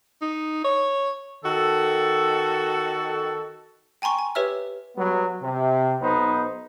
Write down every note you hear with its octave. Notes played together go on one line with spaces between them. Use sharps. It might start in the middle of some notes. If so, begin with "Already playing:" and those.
D#4
C#5
D#3 F#4 A4
G5 G#5 A#5 C6 C#6
G#5
G4 B4 C#5 E5 E6 F6
F#3 G3 B3
C3
B1 B3 D#4 C5